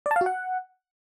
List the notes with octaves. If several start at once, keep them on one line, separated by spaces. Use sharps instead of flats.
D5
A5
F5
F#4
F#5